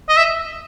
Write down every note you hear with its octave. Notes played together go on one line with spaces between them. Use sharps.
D#5
E5